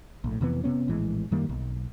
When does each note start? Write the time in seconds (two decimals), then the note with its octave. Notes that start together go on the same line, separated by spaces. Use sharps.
0.24 A#1 A2
0.41 F2 C3 E3 B3
0.64 C3 B3 C#4
0.88 A#1 A2 E3 G#3
1.31 F#2 D#3 G3 A#3
1.49 B1